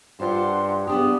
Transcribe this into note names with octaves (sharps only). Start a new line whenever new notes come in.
G2 D4 F4 C5 F#5 C6
B3 D4 G4 G#4 D#6